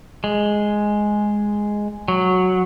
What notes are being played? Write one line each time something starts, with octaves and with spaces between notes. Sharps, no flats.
G#3
F#3